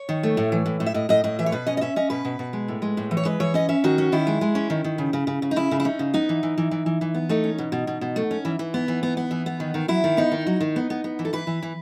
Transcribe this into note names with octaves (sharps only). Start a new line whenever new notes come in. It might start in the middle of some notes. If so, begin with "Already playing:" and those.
Already playing: C#5
D#3
A3
A2
E3
A2
A2
E5
A2 D#5
A2 D#5
A2 D#5
E3 E5
C#5
B2 B4
C#4 D#5
D#5
C#4 E5
C#4 D#5
B2 B4
B2
B2
G#3
A2
G#3
A2
E3
C#5
G#3 B4
E3 C#5
C#4 D#5
C#4 E5
D#3 F#4
C#4
D#3 E4
G#3
G#3
C#4
D#3
D#3
C#3
C#3
C#3
C#3
D#4
C#3 E4
C#3
E4
C#4 D#4
C#3
B3 D#4
E3
E3
E3
E3
E3
E3
B3
A3 D#4
C#4
B2
B2
B2
B2
A3
C#4
E3
E3
B3
E3
B3
B3
E3
B3
D#3
D#3
F#3 E4
D#3
B3 D#4
D#3
F#3
D#3
B3
B3
B3
E3
A4
E3 B4
E3
E3